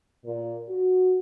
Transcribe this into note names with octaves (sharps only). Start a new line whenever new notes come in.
A#2
F#4